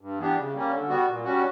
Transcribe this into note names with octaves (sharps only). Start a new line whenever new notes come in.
G2
E3 B3 D4 G4
C#3
G3 A#3 C#4
D3
G3 B3 F#4
A#2
G3 C#4 F#4